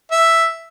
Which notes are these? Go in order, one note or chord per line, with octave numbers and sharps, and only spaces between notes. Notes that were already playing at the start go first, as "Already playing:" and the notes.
E5